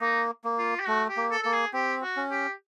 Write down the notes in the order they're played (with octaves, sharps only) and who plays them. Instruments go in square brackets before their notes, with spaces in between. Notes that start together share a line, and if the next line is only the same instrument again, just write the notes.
[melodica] A#3 [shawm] D#4
[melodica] A#3
[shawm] F4
G4
[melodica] A3 [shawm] F#4
[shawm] G4
[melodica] A#3
[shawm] A4
[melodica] A#3 [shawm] A4
[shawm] G#4
[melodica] C4 [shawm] G4
[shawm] F#4
[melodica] C#4
[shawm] G4